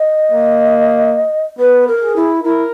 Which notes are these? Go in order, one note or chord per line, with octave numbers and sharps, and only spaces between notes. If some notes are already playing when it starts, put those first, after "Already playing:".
Already playing: D#5
A#3
B3 B4
A#4
G#4
E4
E4 A#4